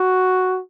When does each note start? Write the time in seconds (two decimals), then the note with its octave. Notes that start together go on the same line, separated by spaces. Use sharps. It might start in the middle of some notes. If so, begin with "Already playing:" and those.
Already playing: F#4